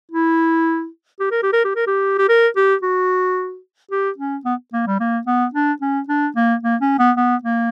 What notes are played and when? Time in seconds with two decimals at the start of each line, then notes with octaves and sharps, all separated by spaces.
0.12 E4
1.20 G4
1.31 A#4
1.43 G4
1.53 A#4
1.65 G4
1.76 A#4
1.87 G4
2.19 G4
2.29 A#4
2.56 G4
2.83 F#4
3.91 G4
4.18 C#4
4.45 B3
4.73 A#3
4.87 G3
5.00 A#3
5.27 B3
5.54 D4
5.81 C#4
6.09 D4
6.36 A#3
6.63 A#3
6.81 C#4
6.99 B3
7.17 B3
7.44 A#3